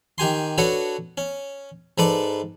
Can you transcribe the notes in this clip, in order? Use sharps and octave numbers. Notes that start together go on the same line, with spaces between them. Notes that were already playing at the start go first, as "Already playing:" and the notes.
D#3 G4 G#5 C6
D4 F#4 A4 B4 C#5
C#4
G#2 A4 B4 D5 A5